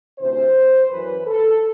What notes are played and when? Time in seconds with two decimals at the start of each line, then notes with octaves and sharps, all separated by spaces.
0.19 D2 C3 E3 C5
0.90 F#2 E3 B4
1.27 A4